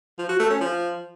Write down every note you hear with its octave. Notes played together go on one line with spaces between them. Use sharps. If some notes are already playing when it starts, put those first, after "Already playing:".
F3
F#4
A3
C#4
F3